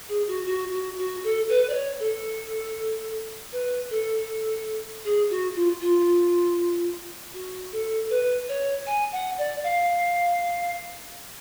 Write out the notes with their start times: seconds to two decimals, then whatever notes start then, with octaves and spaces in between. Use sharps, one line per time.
0.08 G#4
0.27 F#4
0.46 F#4
0.72 F#4
0.98 F#4
1.23 A4
1.49 B4
1.69 D5
1.73 C#5
1.99 A4
3.52 B4
3.90 A4
5.04 G#4
5.29 F#4
5.55 F4
5.80 F4
7.33 F#4
7.72 A4
8.10 B4
8.48 C#5
8.86 G#5
9.12 F#5
9.38 D5
9.63 F5